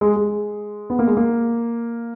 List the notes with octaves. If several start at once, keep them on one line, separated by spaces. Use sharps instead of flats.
G#3
G#3
B3
A#3
G#3
A#3